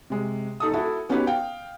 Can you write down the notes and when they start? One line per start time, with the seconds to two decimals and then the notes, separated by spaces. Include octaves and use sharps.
0.10 C3 G#3
0.60 D#1 D#4 A4 D#6
0.73 E4 F#4 A4 E5
1.09 B3 C#4 D#4 F#4 G4 B4
1.27 F5 G5